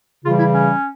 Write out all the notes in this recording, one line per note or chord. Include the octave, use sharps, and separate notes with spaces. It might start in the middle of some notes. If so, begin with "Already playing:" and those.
C#3 E3 G3 F4
E4
C#4